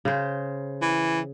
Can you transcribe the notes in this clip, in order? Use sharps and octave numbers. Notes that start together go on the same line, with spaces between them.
C#3 C5
E3